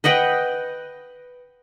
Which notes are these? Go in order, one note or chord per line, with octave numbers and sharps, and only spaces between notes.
B4 D#5 F#5 G5